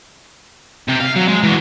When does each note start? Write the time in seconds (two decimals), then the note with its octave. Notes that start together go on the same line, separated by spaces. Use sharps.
0.88 C3 G4
1.00 F5
1.16 F#3
1.29 G#3
1.44 E3 F#4